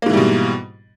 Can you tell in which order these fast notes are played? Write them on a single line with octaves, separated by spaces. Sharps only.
A#3 G#2 E3 G3 B2